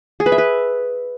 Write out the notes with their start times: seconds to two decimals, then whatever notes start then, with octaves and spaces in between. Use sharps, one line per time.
0.20 G#4
0.26 B4
0.32 E5
0.38 B4